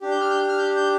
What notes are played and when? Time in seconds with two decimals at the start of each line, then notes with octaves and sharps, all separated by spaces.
0.01 D4 G4
0.11 G6
0.21 F6
0.30 G6
0.48 F6
0.59 G6
0.77 G6